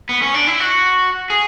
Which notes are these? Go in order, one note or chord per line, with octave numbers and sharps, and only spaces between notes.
B3
C#4
D4
E4
F#4
G#4